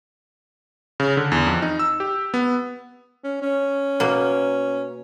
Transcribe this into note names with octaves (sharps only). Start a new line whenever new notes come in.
C#3
D3
E2
F2
D#4
E6
G4
B3
C#4
C#4
B2 A#3